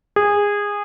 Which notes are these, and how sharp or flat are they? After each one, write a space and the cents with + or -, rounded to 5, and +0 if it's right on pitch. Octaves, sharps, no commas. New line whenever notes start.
G#4 -20